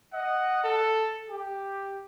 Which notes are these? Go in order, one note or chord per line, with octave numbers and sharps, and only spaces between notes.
D#5 F#5
A4
G4